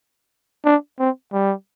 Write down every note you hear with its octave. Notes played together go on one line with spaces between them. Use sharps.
D4
C4
G3